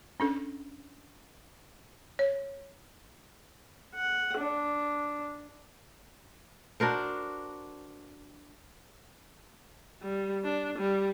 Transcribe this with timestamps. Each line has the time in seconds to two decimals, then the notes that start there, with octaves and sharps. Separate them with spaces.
0.20 C#4 D4 A4
2.19 C#5
3.95 F#5
4.37 D4
6.80 D4 F#4 A#4 C5
10.02 G3
10.45 D4
10.78 G3